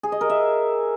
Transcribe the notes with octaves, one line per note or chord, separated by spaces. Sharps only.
G#4
D#5
A#4
E5